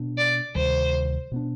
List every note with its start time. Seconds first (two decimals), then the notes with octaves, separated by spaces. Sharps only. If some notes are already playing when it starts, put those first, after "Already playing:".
Already playing: B2 B3 D4
0.18 D5
0.55 D2 C3 D#3 G3 C5
1.32 B2 B3 D4